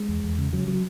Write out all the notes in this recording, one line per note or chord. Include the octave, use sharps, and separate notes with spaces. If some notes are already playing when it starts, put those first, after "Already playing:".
Already playing: G#3
E2
E2
C#3
C#3 F#3
F#3